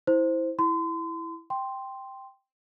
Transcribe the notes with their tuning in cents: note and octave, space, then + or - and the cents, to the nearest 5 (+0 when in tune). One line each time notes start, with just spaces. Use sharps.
E4 -15 C5 +0
E4 +0 C6 -35
G5 +0 C6 +0